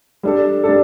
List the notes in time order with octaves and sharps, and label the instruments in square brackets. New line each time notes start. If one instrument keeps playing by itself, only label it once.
[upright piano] G3 D4 A4
G3 D4 A4